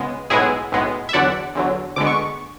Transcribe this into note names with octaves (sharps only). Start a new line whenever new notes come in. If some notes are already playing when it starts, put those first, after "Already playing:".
Already playing: C#2 C#3 G#3 B3
B1 A2 G#3 B3 E4 G#4
B1 A2 G#3 B3
E5
E2 D3 F#3 D5 F#5
E2 D3 F#3
D2 D3 G#3 B3 D6
C#6